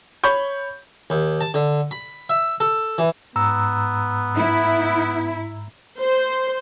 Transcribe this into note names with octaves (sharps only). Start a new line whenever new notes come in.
C#5 B5 C#6 G6
D#2
A5
D3
B5
E5
A4
E3
G#2 B3 A#5 E6
E4
C5